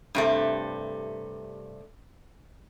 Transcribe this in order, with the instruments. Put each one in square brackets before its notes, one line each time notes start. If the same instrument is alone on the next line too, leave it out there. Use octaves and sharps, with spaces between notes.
[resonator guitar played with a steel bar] G2 C3 A3